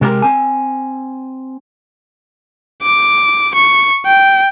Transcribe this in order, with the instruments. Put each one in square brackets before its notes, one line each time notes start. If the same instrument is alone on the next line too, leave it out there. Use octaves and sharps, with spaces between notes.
[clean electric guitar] C3 G#3 C4 G4 A#4
C4 G#5
[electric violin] D6
C#6
G5